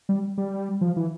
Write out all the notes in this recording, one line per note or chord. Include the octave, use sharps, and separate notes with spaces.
G3
G3
F3
E3